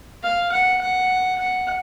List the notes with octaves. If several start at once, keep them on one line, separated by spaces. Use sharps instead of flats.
F5
F#5
F#5
F#5